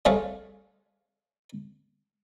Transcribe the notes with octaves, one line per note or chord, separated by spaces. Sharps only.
G3 A3 C4 G#4 C#5 F5